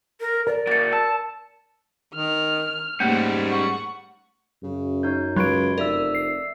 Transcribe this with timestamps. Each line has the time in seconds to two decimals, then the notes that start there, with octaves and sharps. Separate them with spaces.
0.20 A#4
0.47 A#4 D5
0.67 F#3 A#3 A6 C#7
0.93 A5 E6
2.14 D#3 F6
3.00 G#2 G3 A3 A#3 C#4
3.49 F#5 C#6
4.63 F#2 C#3
5.03 D#4 C#5 G6
5.36 C#2 F#3 B5 C6 G#6 D7
5.78 F1 A#4 D5 E5 E6
6.15 C7